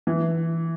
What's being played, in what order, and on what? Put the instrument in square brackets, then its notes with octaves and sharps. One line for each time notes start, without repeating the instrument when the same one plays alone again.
[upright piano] E3